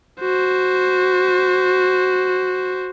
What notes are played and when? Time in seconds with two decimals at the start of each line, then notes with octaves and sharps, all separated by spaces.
0.21 F#4 C5